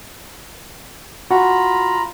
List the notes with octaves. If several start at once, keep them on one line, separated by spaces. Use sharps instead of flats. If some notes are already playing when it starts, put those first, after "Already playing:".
F4 F#4 A#5 B5